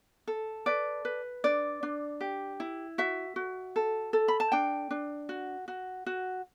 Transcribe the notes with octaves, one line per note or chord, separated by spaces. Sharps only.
A4
B4 D5
B4
D4 D5
D4
G4
E4
F#4 E5
F#4
A4
A4
B5
A5
D4 G5
D4
F#4
F#4
F#4